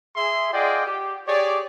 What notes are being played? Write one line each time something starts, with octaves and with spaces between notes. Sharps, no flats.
G#4 E5 C6
F4 G#4 D5 D#5 F#5 G5
G4
G4 G#4 C#5 D5